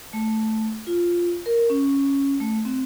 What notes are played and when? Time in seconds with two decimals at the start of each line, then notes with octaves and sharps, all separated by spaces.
0.13 A3
0.87 F4
1.46 A#4
1.70 C#4
2.40 A3
2.65 C4